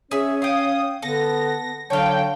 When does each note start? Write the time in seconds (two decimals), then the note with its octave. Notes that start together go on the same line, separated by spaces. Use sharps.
0.11 C#4 G#4 C#5 E5
0.42 F5 G5 D#6
1.02 D3 B3 A4 A#6
1.90 D3 F#3 C#5 F5 G5 A5